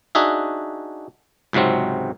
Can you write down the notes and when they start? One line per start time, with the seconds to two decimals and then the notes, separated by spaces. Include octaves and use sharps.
0.15 D4 D#4 F#4 G#4 E5
1.53 C#2 G#2 C3 F#3 C4